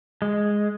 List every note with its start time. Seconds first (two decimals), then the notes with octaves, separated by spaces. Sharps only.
0.22 G#3